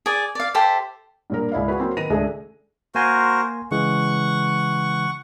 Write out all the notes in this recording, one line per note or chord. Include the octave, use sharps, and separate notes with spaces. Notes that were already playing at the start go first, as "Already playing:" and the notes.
G#4 D5
D5 F5
G4 A4 C5 E5
G2 A#2 A#4
C#2 E4 D5 F5
F#4 G#4 B4
F#3 A#3 C4 G#5
D#3 B4 A#6 D#7
C#2 A3 D4 G#4 E5
A#3 F#4 A#4 C5 G#5 C6
C#3 E3 G#3 F#5 C#6